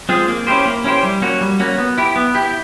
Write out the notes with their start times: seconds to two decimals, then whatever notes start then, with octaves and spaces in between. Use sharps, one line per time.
0.09 G#3 C4 F4 G#4
0.28 A#3
0.47 C#4 E4 G4 C5
0.65 A#3
0.84 C#4 E4 G4 C5
1.03 G3
1.22 A#3 C#4 F#4
1.41 G3
1.60 A#3 C#4 F#4
1.78 B3
1.98 E4 G4
2.16 B3
2.35 E4 G4